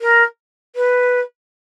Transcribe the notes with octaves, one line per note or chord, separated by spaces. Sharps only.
A#4
B4